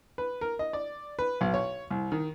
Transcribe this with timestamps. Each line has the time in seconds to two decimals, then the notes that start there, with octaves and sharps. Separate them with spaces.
0.18 B4
0.41 A#4
0.59 D#5
0.73 D5
1.19 B4
1.41 B1
1.54 C#5
1.90 C2
2.12 D#3